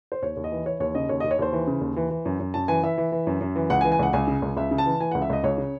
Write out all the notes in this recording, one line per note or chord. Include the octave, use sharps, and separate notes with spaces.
C5
D#2 C#5
D#2
D#5
E3
E3 C#5
D#2 C#5
C#3 D#5
D#2 C#5
D#2 D#5
C#5
D#2 C5
E3
C#3
D#2
E3
E3
F#2
F#2
F#2 A5
E3 G#5
E3 E5
E3
E3
F#2
F#2
E3
C#2 F#5
G#5
E3
G#5
C#2 F#5
C#2 G#5
C#3
C#2
C#2 E5
C#3
A5
E3
E3 G#5
C#2 F#5
E5
C#2 D#5
C#2 C#5
C#3